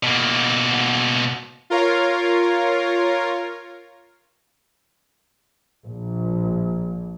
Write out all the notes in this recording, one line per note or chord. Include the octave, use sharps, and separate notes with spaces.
B2 A#3
F4 A#4 C#5 F5
A#1